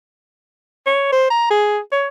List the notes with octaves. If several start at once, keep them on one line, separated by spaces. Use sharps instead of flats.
C#5
C5
A#5
G#4
C#5